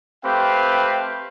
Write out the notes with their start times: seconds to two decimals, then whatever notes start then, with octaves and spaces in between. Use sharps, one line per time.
0.23 A3 C4 G4 B4 F5 G5